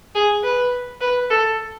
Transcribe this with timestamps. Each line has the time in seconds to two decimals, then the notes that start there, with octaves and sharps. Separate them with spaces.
0.15 G#4
0.44 B4
1.01 B4
1.30 A4